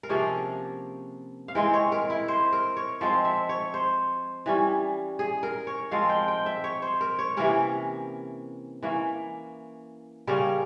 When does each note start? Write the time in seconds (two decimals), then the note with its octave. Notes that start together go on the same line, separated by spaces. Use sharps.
0.03 A#4
0.09 C3 F3 A#3 C#4 G#4
1.48 F5
1.55 E3 G#3 C4 G5
1.73 C#5
1.92 A#4
2.10 E4
2.28 C5
2.53 A#4
2.77 C#5
3.01 F3 G#3 C4 C5
3.25 E5
3.49 C#5
3.74 C5
4.46 E3 G3 C#4
5.19 G#4
5.43 A#4
5.67 C#5
5.91 F3 G#3 C4 F5
6.09 G5
6.28 G5
6.46 E5
6.64 C#5
6.82 C5
7.01 A#4
7.19 C#5
7.37 C3 E3 A#3 C#4 A#4
8.83 E3 A#3 C#4
10.27 C#3 G3 A#3 C#4 A#4